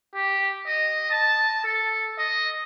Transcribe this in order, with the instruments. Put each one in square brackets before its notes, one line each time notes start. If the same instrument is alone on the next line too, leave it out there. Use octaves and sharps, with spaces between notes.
[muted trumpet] G4
D#5
A5
A4
D#5